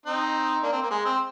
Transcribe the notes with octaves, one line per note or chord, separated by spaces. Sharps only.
C4 D#4
A#3 D4
C4
A#3
G#3
C4